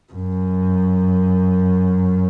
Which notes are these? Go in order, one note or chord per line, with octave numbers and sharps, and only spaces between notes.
F#2